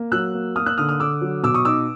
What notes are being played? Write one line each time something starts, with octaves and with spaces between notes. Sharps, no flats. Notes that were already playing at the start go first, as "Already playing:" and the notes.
Already playing: A#3
F#3 E6 F#6
A#3
A#3 D#6 F6
E6 F#6
D3 D#6 F6
D#6 F6
D3 D6 E6
F#3
B2 D6 E6
C#6 D#6
D#4 D6 E6